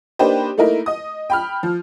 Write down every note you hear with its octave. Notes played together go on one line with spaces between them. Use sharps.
A#3 D4 D#4 G4 B4 C5
A3 A#3 D#4 E4 A#4
D#5 D#6
G5 B5 F6
F3